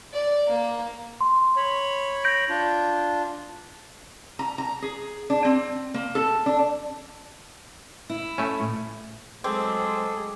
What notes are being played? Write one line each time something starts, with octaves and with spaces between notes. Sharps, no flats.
D5
A#3
C6
C#5 B5
G6 A#6 D7
D4 F4
A#5
A#5
G#4
D4
C4
A#3
A4
D4
E4
A3 C#4
A2
F#3 G#3 A3 C4 G#4 A4 D6